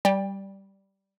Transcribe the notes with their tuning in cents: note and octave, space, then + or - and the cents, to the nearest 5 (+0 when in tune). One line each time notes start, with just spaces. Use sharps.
G3 -10 D5 +0 G5 +25